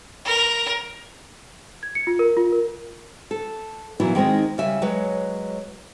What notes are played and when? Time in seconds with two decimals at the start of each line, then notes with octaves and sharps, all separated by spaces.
0.25 A#4
1.83 G#6
1.95 C#7
2.07 F4
2.19 A#4
2.37 F4
2.52 A#4
3.31 A4
4.00 A#2 E3 F#3 B3 E4
4.15 D#3 G#3 C4 C#4 D#4
4.58 C#3 G3 E5 G#5
4.82 F#3 G#3 B4 C#5